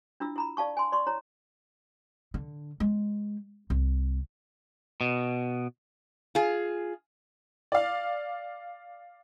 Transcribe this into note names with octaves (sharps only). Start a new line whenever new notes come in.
D4 E4 F4 E6
E4 A#5 B5
D5 F5 A5 C#6
G#5 C6
D5 C6 C#6
E4 C#5 A#5
D3
G#3
C2
B2
F4 G#4
D5 F5